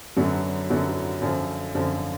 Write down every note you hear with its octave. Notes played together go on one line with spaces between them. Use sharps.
F#2 D3 F#3 B3
F#2 D3 F#3 B3
F#2 D3 F3
F#2 D3 F3